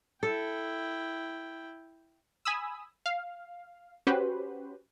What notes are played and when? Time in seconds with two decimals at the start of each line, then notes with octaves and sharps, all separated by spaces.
0.23 E4 A4 G5
2.45 G#5 B5 D#6 E6
3.06 F5
4.07 C#4 F#4 G4 B4 C5